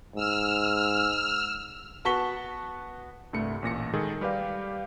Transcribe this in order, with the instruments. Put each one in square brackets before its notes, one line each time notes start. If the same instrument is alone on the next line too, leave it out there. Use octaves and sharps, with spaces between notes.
[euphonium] G#2 [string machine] E6 F6
[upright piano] B3 F#4 A5 C#6 B6 G7
[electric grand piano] C2 G2 A3 C#7
A1 A#2 A#6 C#7
D#3 G#3 G#4 A4
G3 G4 B4 D5 F5